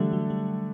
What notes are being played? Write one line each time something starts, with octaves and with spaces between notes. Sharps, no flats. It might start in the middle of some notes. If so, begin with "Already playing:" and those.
Already playing: D3 E3 F#3 G3 A3 D4 A4
F#3
G3